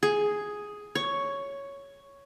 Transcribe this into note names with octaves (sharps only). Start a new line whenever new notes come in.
G#4
C#5